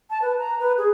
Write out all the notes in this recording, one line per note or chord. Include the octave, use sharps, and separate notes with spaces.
A5
B4
A#5
B4
G#4